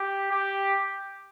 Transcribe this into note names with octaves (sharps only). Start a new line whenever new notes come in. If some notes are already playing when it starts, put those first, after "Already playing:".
Already playing: G4
G4